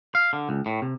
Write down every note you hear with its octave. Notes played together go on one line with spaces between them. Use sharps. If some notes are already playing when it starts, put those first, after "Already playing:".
F5
D3
C#2
A2
C3